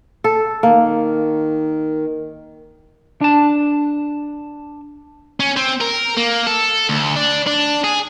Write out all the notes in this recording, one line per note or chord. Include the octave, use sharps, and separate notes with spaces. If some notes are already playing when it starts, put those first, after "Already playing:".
A4
D#3 A#3
D4 A5
C#4
C4
A#4
A#3
A4
D2
D4
D4
G#4